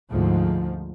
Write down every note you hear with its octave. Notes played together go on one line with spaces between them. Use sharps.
D2 G#2 F3